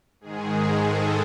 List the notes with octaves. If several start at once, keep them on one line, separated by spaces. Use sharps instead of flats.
G#2 D#3 G#3 G#4
A4